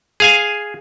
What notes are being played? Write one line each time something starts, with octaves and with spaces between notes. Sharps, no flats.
G#4 F5 G#5